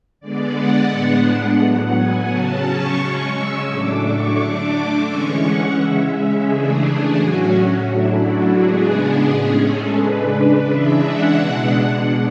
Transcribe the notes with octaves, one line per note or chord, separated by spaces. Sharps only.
D3 G#3 B3 D5
F#5
A2 G#3 B3 D4 F#5
A2 F#3 B3
G#5
C#3 F#3 C#4 A5
C#6
C#3 G#3 C#4
E6
A2 F#3 A3 D4 D6
C#6
D3 A3 D4 D6
E3 G#3 C#4 C#6
F#5
C#3 G#3 C#4 E5
E5
C#3 E3 A3 D4 G#4
G#4
A2 F#3 C#4 F#4
A2 F#3 A3 D4 E4
F#4
C#3 G#3 B3 D4 G#4
A2 G#3 C#4 G#4
A4
C#3 G#3 D4 B4
C#3 E3 G#3 D4 E5
F#5
B2 G#3 D4 F#5